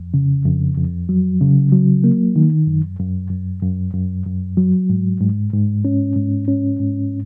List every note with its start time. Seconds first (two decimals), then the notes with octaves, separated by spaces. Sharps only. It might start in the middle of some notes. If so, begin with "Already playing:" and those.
Already playing: F2
0.14 C#3
0.46 F2
0.77 F2
1.09 F#3
1.41 C#3
1.72 F#3
2.04 A#3
2.36 D#3
2.67 F#2
2.99 F#2
3.30 F#2
3.63 F#2
3.94 F#2
4.26 F#2
4.57 F#3
4.90 G#2
5.20 G#2
5.53 G#2
5.85 C#4
6.16 G#2
6.48 C#4
6.80 G#2